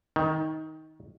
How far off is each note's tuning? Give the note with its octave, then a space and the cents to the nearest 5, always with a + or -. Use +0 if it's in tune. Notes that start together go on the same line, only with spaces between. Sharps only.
D#3 +15